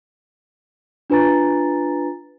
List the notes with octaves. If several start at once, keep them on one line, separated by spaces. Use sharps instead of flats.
D4 F4 B4 G#5 A#5 A6